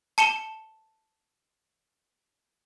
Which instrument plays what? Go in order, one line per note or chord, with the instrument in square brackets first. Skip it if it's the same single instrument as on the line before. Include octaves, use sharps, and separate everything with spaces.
[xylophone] A5 C#7 E7 G7